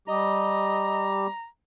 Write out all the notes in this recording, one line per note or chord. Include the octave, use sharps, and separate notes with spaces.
G3 G4 D#5 A#5